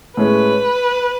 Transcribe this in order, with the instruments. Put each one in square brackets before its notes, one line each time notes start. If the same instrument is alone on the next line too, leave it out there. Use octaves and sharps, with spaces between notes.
[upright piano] A2 G#3 C#4 [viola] B4